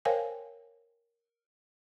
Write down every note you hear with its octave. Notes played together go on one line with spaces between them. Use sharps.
A#4 C5 C#5 F5 G5 G#5